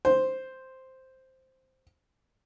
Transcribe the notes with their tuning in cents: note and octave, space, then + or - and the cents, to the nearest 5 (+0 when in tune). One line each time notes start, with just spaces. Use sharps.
C5 +0